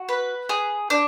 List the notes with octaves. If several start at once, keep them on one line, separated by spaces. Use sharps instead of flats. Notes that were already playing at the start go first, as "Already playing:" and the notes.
Already playing: F#4
B4
G#4
D4